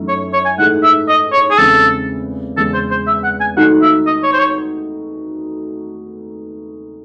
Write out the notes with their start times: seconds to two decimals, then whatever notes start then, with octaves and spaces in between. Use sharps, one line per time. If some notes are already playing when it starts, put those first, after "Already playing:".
Already playing: F#2 E3 A3 D#4
0.08 C#5
0.33 C#5
0.45 G#5
0.58 G#2 E3 A3 D#4 G#4 F#5
0.83 E5
1.08 D#5
1.33 C#5
1.51 G#4
1.58 E2 C#3 G#3 C4 A4
2.57 E2 C#3 G#3 A4
2.74 C5
2.91 C5
3.07 E5
3.24 F#5
3.41 G#5
3.56 D#3 A3 D#4 F#4 A4 F#5
3.82 E5
4.07 D#5
4.23 C#5
4.33 C5
4.40 C#5